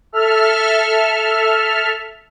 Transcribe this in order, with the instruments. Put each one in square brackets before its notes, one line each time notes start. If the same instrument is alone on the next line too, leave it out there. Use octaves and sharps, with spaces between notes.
[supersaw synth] A4 E5 F6